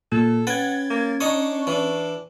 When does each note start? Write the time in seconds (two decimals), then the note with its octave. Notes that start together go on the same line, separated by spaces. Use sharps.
0.12 A#2 A4
0.47 C#4 B4 F#5 G5 G#6 A6
0.90 A#3
1.21 D4 D#4 C#5 D#5 C#6
1.67 E3 D4